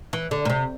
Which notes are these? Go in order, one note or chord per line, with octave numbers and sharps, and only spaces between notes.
E3
D3
A#2
C3